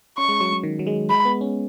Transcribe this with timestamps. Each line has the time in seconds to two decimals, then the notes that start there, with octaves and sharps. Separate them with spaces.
0.18 C#4 C#6
0.29 G#3
0.41 F#3
0.53 F#3
0.63 D#3
0.79 F#3
0.87 G#3
1.10 G#3 B5
1.25 B3
1.41 C#4